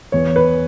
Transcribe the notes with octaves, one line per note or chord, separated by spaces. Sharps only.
E2 C#5
B4